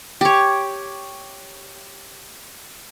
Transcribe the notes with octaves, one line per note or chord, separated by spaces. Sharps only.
G4 C#5